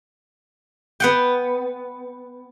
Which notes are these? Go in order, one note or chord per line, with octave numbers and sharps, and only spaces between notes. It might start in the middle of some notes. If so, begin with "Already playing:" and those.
B3 F#5 G5